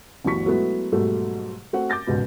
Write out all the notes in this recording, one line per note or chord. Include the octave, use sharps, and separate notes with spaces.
G1 D2 E3 F#3 C#6 B6
F#3 G#3 A3 B3 E4 F#4
G#2 B2 F#3 G3 A3
A3 C4 F#4 F#5
D6 G6 A6 A#6
E1 C#2 G#2 B2 B4